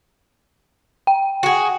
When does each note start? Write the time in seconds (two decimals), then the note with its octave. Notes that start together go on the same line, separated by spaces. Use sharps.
1.07 G5
1.43 F#4 G#4